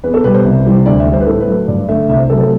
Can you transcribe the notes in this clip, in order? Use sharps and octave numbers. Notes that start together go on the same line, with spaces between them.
E2 B4
A4
B2 G3 B4
C5
C2
C3 E3 G3
D2 D5
E5
D3 G3
C5
B4
A2 A4
B4
F#3 A3
G2 D5
D3 A3 E5
C2 E5
C5
C3 F#3 A3 A4
A4